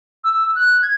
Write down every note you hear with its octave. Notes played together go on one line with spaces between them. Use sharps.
E6
F#6
G#6